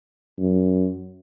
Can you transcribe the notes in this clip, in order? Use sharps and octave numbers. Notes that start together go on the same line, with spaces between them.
F#2